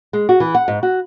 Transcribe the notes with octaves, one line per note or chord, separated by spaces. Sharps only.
G#3
F#4
E3
F#5
G#2
F#4